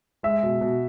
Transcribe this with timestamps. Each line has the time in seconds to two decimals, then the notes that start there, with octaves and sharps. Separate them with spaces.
0.23 G#3 E5
0.43 B2
0.61 B2